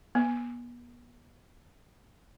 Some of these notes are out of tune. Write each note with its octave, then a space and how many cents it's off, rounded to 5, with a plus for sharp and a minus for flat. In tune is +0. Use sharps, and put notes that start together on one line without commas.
B3 -40